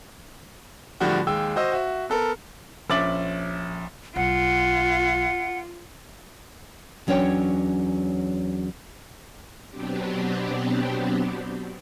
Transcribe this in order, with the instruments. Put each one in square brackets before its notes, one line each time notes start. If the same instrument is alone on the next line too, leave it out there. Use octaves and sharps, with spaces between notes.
[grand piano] A2 D3 F3 G3 F#4
D#2 G#3 G5 E6
F#4 C5 D#5 E6
F#4 E5
B3 A4 A#4
A#1 C#4 E5 D6 A6 F#7
[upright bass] B1 [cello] F4 [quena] F#5
[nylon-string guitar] E2 F#3 C#4 D4 C#5 G5
[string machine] B2 F#3 B3 C4 D4 G4